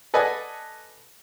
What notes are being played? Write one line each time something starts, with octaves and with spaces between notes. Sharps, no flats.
A4 B4 D5 D#5 F#5 G#5